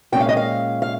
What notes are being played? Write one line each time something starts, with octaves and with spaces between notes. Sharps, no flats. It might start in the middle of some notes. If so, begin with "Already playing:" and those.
A#2 G#3 C#4 G5
F5
D#5
F5
F5